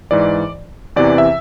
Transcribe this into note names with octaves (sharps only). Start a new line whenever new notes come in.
G#2 E3 D5
E2 C3 E3 D5
E5